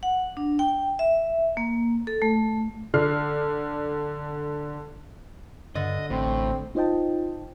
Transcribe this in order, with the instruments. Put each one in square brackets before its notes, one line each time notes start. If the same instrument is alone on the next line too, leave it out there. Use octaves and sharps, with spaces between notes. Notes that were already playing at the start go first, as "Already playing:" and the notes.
[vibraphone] F#5
D4
G5
E5
A#3
A4
A3
[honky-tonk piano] D3 D5 F6 C7
[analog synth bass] G2 [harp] D3 [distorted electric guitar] D#5
[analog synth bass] A1 [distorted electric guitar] A2 [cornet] C4
[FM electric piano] D#4 F4 C5 D#5 G5 A5